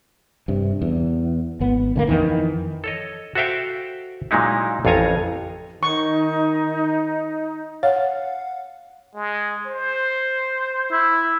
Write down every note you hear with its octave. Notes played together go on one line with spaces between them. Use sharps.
G2 C3
E2
G#1 B3
D3 E3 A#3
F2 D#3 E3
A4 C#5 D#5
F#4 A4 C5 E5 F5 G5
A#2 F#3 G#3 D#4 E4
A1 F2 F4 C#5 G#5 A#5
D#3 D#4 C#6
C#5 F5 F#5
G#3
C5
E4